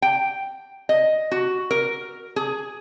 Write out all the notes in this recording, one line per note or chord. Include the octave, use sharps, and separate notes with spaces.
G5
D#5
F#4
A#4
G#4